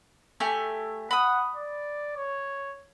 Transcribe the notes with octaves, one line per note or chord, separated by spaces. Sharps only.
A3 G4 G#5
F#5 B5 D#6
D5
C#5